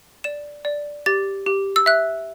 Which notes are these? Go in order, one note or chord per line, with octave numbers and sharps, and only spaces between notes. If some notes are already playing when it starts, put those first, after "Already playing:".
D5 E7
D5
G4 A6
G4
E6
E5 F#6